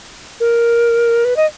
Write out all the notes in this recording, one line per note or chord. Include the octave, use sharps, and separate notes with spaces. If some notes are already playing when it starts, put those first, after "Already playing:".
A#4
B4
D#5